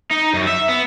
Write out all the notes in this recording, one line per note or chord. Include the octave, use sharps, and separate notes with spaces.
D#4
F#2
E5
B3